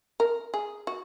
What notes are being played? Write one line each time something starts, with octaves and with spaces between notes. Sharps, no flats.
A#4
G#4
F#4